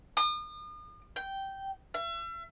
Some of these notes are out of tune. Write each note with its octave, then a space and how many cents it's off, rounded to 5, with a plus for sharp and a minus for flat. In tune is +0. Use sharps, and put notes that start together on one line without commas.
D#6 -40
G5 -10
E5 +40